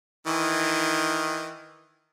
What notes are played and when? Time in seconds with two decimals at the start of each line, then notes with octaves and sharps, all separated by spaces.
0.27 D#3 E3